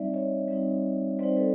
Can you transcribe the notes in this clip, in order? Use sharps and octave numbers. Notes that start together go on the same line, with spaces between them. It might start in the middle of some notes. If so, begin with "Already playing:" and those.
Already playing: G3 C4 D#4 D5 E5
C#5 D#5
G3 C4 D#4
G3 C4 D#4 C5 D5
A4 B4